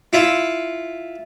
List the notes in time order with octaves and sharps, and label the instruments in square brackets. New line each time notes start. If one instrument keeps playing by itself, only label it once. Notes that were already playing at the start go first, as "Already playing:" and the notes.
[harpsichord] E4 F4 E5